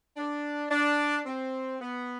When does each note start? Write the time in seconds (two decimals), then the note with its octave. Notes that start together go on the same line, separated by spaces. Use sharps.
0.17 D4
0.71 D4
1.26 C4
1.81 B3